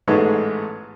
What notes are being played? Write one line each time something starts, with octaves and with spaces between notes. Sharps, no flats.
A1 G#2 G#3 A3 B3